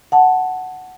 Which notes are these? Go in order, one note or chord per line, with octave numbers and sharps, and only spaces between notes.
F#5 A5